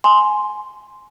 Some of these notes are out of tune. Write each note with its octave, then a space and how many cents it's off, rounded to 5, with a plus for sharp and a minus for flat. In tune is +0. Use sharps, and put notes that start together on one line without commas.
G#5 +15 C6 +0